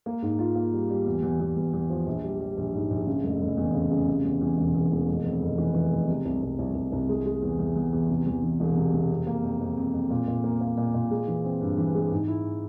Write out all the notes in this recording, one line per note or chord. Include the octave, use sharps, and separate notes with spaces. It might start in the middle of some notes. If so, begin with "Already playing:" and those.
A#3
G#2
F4
A#3
G3
G3
E2
E2
E2
E2
E2
F3
A#1
G3
G3
A#1
G#2
A#1
C#3
F1
F1
E2
C#3
C#3
C3
E2
E2
E1
E2
E1
F1
F2
F1
E3
E3
F1
C3
C2
C2
C2
C2
C2
G#3
G#3
E2
E2
E2
E2
C3
E2
E3
E1
C3
C3
F2
A#3
F2
F2
F2
F2
A#2
A#2
A#3
A#3
A#2
A#2
G#3
E3
C4
G2
E3
G#3
G#2
E4